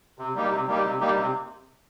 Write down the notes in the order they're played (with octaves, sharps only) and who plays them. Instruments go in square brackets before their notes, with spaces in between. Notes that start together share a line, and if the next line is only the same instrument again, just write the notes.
[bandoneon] C3
G3 A#3 D#4 G4
C3
G3 A#3 D#4 G4
C3
G3 A#3 D#4 G4
C3